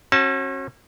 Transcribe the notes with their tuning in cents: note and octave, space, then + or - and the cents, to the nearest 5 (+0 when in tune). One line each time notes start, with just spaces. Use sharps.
C#4 -40 F#4 +0 A5 +0